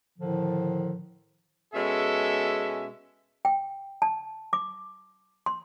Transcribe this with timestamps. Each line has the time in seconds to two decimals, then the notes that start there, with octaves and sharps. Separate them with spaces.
0.18 A2 D3 D#3 F3
1.74 B2 G#3 C#4 A4 E5
3.45 G5
4.02 A5
4.53 D6
5.46 C6